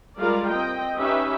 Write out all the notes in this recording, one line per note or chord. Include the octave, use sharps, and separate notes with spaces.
G3 G#3 F4 A#4 D5 F5
C4 D#5 G5
C#4 D#4 G4 B4 E5